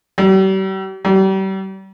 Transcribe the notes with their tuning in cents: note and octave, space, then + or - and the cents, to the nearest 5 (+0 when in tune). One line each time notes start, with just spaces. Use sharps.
G3 -40
G3 -35